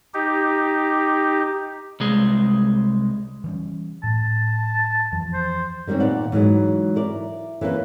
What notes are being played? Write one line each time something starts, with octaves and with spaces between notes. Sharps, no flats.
D#4 G4
C2 G#3
E3 G3 C#4
A2 A5
F2 E3 F3
C5
D#3 G3 A#3 C4 C#4
A#2 D#3 B3 D5 F#5
G#2 E3 F#3 G#3
E4 A#4 D5
E3 A#3 C#4 B4